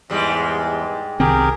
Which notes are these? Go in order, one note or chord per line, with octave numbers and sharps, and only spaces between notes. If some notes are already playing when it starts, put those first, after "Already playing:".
E2 G#2 G3 G#3
C2 D#3 C4 G4 G#4 A#4